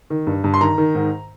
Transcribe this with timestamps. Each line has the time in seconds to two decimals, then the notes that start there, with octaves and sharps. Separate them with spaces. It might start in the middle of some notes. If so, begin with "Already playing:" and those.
0.10 D#3
0.27 G2
0.44 G2
0.54 C6
0.61 D#3 A#5
0.78 D#3
0.95 G#2